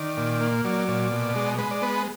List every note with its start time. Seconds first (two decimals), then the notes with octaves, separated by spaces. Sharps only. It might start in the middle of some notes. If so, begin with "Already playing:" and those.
Already playing: D#3 D5
0.17 A#2
0.41 A#3
0.64 F#3 D5
0.88 A#2
1.12 B2
1.36 G#3
1.58 G#3 B4
1.71 D5
1.82 B3 B4